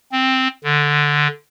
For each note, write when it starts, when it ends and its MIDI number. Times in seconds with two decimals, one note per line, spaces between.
0.12 0.48 60
0.64 1.28 50